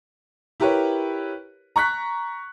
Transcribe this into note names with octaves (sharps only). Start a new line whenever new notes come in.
E4 G4 A#4 B4 C#5
A#5 C#6 F#6 B6